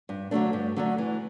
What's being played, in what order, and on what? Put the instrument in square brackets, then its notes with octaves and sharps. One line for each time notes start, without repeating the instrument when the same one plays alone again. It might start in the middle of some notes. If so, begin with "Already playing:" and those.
[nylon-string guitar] G2
D3 F#3 A3 D4
G2
D3 F#3 A3 D4
E3